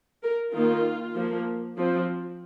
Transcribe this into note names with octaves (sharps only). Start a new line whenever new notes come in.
A#4
D#3 A#3 F4
F3 A#3
F3 C4